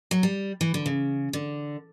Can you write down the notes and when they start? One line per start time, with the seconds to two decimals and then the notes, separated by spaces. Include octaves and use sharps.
0.11 F#3
0.23 G3
0.61 E3
0.74 D3
0.86 C#3
1.33 D3